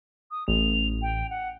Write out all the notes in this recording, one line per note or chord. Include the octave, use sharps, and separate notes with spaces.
D#6
A1 F7
G5
F#5